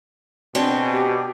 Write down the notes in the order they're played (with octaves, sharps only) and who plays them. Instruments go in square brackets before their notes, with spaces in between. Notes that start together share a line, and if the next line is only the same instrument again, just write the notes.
[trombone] B2 [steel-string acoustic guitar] C4 D4 G#4 [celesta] F#4 D5 A5
[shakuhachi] G4